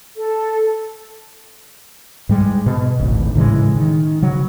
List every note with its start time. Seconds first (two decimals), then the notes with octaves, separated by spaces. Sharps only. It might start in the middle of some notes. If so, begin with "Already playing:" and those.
0.17 A4
2.29 G#2 G3 G#3
2.66 B2
2.99 D1 G#1 D2
3.35 A2 C#3 E3 G#3
3.76 D#3
4.22 C#3 F#3